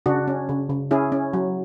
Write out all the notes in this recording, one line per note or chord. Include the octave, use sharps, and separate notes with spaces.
C#3 D4 F#4
C#4
C#3
C#3
C#4 E4 G#4
C#4
F#3